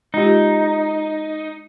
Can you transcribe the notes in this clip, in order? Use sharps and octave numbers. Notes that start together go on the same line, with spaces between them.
G#3 D#4 F4 G4